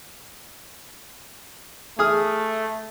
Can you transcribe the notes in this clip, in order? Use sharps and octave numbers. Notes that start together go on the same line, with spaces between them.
A3 G#4 D#6 F6